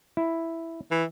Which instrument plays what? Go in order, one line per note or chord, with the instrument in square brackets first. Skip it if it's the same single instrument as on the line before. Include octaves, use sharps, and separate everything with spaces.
[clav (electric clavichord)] E4
[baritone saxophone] E3